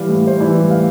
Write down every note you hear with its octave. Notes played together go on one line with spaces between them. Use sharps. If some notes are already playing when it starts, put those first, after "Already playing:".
Already playing: E3 G3 F5
A2
A2 C5
E3 D5
G3
A2 F5